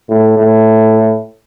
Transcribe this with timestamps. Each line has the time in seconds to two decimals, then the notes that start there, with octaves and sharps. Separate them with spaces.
0.09 A2
0.38 A2